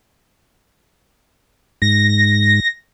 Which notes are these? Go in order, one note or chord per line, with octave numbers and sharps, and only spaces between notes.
G#2 A#6